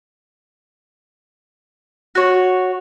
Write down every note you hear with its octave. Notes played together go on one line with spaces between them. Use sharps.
F#4 C#5